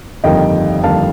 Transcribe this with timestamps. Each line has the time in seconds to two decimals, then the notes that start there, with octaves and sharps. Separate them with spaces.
0.24 G1 F2 D#3 G3 A#3 D#5 G5
0.83 G1 F2 D#3 G3 A#3 F5 A5